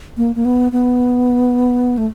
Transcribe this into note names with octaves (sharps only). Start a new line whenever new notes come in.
A#3
A#3
B3
B3
A3